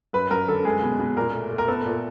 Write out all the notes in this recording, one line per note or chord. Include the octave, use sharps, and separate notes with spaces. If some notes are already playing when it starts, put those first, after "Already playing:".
F#2 B4
F#2 A#4
D3 A4
G#3 G#4
B2
B2
A#2 A#4
A3
A3
A#4
B3 A4
A#2